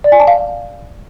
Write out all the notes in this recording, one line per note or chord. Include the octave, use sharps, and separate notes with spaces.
D5
G#5
A5
F5